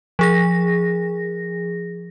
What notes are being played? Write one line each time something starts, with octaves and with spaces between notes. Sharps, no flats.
F3 G#4 A#6